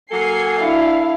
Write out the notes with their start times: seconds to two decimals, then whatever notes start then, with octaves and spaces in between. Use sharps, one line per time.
0.11 F#3 A#3 A4 G#5 C7
0.59 D4 E4 F5